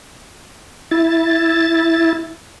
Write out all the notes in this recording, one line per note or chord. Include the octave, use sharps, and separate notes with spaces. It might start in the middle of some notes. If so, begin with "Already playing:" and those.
E4 A6